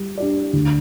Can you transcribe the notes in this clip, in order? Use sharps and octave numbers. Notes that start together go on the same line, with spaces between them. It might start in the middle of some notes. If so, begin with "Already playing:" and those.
Already playing: G3 G4
D4 G4 D5
D2